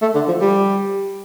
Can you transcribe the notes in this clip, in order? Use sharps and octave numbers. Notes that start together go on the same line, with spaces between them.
A3
D3
F3
G3